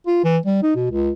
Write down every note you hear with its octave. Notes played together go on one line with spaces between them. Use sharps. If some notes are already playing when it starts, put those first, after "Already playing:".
F4
E3
G3
D#4
B2
C#2